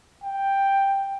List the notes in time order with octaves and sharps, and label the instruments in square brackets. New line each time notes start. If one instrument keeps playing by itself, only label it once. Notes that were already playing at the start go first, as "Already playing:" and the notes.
[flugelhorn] G5